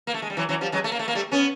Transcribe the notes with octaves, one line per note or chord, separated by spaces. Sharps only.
A#3
A3
G#3
G3
E3 F#3
E3 F#3
F3 G3
F#3 G#3
A3
A#3
A3
A#3
G3 A3
B3 C#4